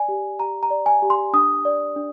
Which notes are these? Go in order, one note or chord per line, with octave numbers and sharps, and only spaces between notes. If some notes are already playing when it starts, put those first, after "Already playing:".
Already playing: D5 G#5
G4
G4 A#5
A#5
D5
G#5
G4
C6
D4 D#6
D5
D4